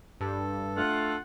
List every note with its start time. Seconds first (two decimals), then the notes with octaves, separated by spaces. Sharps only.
0.21 G2 A4
0.77 A3 D4 F4 F#5